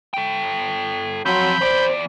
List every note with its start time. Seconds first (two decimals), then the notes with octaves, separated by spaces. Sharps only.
0.14 A4 G5
1.26 F3 F#3 C4 B5 G6
1.61 E2 C5 D5